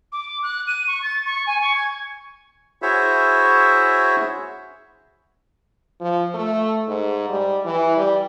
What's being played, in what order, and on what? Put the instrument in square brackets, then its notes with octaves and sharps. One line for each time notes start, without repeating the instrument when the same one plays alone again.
[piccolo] D6
F#6
D#7
C#6
A6
C#6
G#5
C#6
G#6
[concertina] E4 F#4 G#4 C5 C#5 E5
[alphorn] F3
A3
G#2
G3
E3
G3